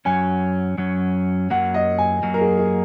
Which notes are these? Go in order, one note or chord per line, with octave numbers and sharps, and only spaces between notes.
F#2 F#3 C#4 G#5
F#2 F#3 C#4
F#2 F#3 A#3 F#5
D#5
G#5
F#2 F#3 A#3
A#4
G#4
G#4